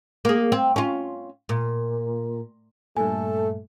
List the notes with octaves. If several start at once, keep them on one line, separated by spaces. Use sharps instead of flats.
A#3 G#4
C4
C#4 F4
A#2
G2 A#2 A3 A4 G#5